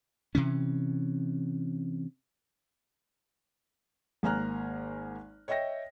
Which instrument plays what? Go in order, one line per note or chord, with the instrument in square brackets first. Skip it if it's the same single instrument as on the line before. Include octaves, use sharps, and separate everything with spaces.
[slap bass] C3 E3 C#4
[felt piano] G#1 A#3 G#5 A#5 F6 F#6
C#5 D#5 E5 G5 A#6